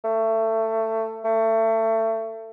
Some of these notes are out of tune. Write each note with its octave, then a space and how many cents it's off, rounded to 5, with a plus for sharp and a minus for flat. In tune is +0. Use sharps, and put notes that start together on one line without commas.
A3 +20
A3 +25